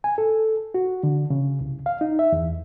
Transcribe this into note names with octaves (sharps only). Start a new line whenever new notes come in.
G#5
A4
F#4
D3
C#3
C2
F5
D#4
E5
E2